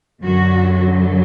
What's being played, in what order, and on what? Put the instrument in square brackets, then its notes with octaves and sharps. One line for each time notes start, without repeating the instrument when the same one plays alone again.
[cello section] F#2 D3 F#3 F#4